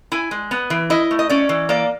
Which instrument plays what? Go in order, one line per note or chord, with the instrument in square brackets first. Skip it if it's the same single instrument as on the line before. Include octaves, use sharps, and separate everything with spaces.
[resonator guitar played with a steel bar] E4 G#5
G#3
B3
E3
E4 D#5
A3
D#5
C#4 D5
E3
A#3 D5